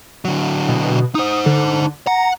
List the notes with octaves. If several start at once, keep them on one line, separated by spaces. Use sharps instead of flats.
D3 F#3
B2
D#4 C5 D#6
D3
F#5 A#5